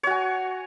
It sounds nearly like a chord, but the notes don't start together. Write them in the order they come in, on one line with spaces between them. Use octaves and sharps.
C#5 F#4 G#5